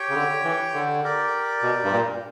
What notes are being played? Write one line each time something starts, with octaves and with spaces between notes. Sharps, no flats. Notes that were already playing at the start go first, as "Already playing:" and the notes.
Already playing: G4 C#5 G5
C#3
D3
E3
D3
G4 A#4 D5
B2
G2
A#2